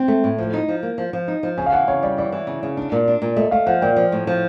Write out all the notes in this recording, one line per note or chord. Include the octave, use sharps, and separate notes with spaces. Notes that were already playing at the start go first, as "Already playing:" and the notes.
Already playing: C4
A3
A2
F3
D#4
F3
A#3
F3
F3
D#4
F3
C#3 G#5
F5
E3 F#5
C#3 C#5
G3 D5
E3 D5
E3
C#3
C#3
D4
A#2
D4
A#2
A3 D#5
A3 F5
F3 F#5
A#2 G5
F3
A2
F3